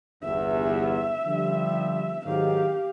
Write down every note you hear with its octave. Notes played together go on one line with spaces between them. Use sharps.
G1 E2 E5
D3 F3 G3
G#2 D#3 F#3 G4 F5